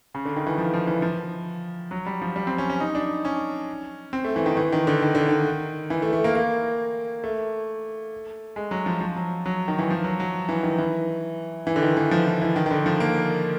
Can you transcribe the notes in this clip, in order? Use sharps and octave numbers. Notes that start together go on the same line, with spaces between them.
C#3
D3
D#3
E3
F3
F3
E3
F3
F#3
G3
F3
G3
C4
C#4
C#4
D#4
D4
C#4
C4
A3
E3
D#3
E3
D#3
D3
D#3
D3
D#3
E3
A3
A3
A#3
A#3
A3
G#3
F#3
F3
F3
F#3
F#3
D#3
E3
F3
F#3
F#3
E3
D#3
E3
E3
D3
D#3
E3
F3
E3
E3
D#3
D#3
D3
F3
A#3